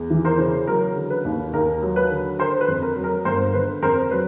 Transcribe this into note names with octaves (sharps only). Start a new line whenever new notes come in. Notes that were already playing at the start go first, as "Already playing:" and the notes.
Already playing: E2
E3
A#4 C5
C#3
F#3 A#4
D3
B4
D#2
D#2 A#4
F#3
B4
D3
D3 A#4 C5
B4
F2
A#4
F#3
A#4
G1 A#4 C5
D3 B4
F2 A#4 C5
F#3 B4